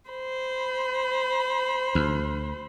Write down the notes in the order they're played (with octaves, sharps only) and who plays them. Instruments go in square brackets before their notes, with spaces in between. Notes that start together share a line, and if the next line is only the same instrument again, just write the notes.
[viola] C5 B5
[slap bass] D2